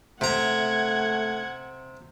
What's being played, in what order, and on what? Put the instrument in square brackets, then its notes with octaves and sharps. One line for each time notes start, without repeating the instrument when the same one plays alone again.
[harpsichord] C3 A#5 [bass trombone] A3 [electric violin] F#5 G#6